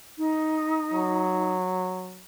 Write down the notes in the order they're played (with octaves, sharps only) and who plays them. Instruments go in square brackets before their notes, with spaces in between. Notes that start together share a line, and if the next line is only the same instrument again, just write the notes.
[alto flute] D#4
[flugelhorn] F#3